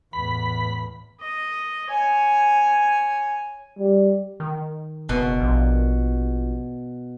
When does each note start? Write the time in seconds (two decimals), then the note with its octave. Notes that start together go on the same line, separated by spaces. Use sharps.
0.13 E2 A2 B5
1.21 D#5
1.91 C#5 G#5
3.78 G3
4.40 D#3
5.09 F#1 B2
5.40 A#1